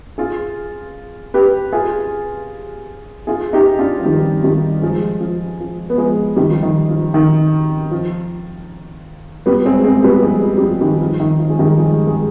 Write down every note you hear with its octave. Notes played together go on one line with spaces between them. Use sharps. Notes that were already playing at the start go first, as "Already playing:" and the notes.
F4 G#4
G4 B4
F4 G#4
F4 G#4
D#4 G4
D4 F4
F3
D#3 G3
D#3 G3
F3 G#3
F3
F3
B3
F3 G#3
D#3 G3
F3
D#3
F3
D#3
F3
G3 B3
G#3 C4
G#3 C4
G3 B3
F3 G#3
F3
G3
F3
D#3 G3
F3
D#3
F3
G#3
D#3 G3
F3 G#3
G#3